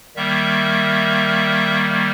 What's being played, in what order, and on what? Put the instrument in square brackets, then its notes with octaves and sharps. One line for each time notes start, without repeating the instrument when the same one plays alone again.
[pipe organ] D#3 G3 A#3 E5